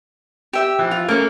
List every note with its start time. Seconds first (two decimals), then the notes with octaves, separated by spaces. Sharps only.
0.53 G4 E5 G5
0.79 E3 F3
0.91 F4
1.08 A3 A#3 C#4 A4 C#5 D6